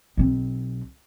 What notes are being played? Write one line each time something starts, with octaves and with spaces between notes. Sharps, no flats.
B1 C4